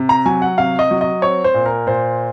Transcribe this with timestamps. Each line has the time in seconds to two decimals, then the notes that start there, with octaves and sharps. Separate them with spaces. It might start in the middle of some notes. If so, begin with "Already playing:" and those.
Already playing: C3
0.09 A#5
0.26 F#3 G#5
0.42 F#5
0.58 C3 F5
0.79 D#5
0.91 F#3
1.01 D#5
1.22 C4 C#5
1.44 C5
1.54 A#2
1.66 A#4
1.87 A#2 C5